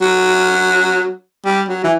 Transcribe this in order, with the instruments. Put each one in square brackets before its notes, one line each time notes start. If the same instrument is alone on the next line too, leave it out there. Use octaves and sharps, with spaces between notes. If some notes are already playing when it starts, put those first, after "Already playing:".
[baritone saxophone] F#3
G3
F#3
E3